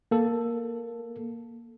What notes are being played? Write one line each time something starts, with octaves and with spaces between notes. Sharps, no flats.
A#3 A4